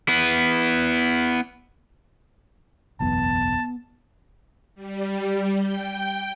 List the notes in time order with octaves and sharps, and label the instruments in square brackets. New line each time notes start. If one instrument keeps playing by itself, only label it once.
[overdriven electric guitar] B3 E4
[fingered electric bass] F#1 B1 E2 [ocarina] B3 [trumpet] A5
[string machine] G3
G5